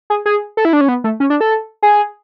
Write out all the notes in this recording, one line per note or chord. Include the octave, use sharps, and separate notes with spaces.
G#4
G#4
A4
E4
D4
C#4
B3
A3
C#4
D4
A4
G#4